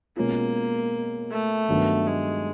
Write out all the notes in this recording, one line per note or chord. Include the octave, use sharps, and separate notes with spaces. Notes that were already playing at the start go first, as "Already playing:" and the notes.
B2 G#3 A#3 C#4 F4
A3
G2 D#3 F#3 B3
G#3